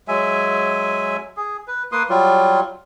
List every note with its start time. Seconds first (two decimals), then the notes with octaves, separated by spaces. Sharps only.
0.08 F#3 G#3 E5 G#5
1.37 G#4
1.68 B4
1.92 A#3 B4 C6 D#6
2.09 F#3 G3 F4